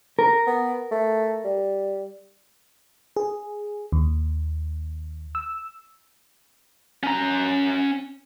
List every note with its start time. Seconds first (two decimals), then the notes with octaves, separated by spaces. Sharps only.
0.19 A#4
0.47 B3
0.91 A3
1.45 G3
3.16 G#4
3.92 D#2
5.35 E6
7.03 C#4 A#5